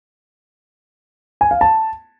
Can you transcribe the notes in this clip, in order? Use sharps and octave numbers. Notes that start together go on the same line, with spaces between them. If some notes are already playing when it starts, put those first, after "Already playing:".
G#5
F5
A5